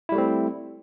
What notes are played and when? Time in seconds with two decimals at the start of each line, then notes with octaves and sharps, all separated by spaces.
0.09 E4
0.12 G3
0.15 A3
0.18 C4